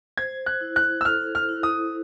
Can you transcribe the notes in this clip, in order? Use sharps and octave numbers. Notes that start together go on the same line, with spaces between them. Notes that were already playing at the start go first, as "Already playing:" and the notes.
C5 G#6
F#6
E4
F#6
E6
A4 F6
F6
E4
D#6